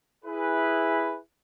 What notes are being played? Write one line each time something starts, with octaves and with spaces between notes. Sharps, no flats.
E4 G#4 B4